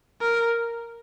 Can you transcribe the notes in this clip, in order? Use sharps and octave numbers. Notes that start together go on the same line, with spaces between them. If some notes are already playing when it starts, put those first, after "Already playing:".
A#4